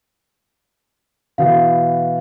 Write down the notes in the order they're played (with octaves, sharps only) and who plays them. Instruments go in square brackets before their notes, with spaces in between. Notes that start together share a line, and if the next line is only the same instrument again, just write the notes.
[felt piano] B2 E3 B3 [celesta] F5